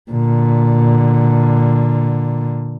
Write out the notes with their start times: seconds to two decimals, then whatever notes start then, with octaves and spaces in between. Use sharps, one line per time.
0.11 A#2 D3